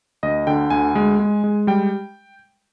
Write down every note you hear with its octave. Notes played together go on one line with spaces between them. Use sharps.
D2 D#5
D3 G5
D2 G#5
G#3
G#3
G#3
G3 G5